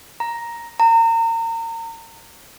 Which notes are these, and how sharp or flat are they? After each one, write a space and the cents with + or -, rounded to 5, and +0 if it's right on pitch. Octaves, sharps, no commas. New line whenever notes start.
A#5 +5
A#5 -30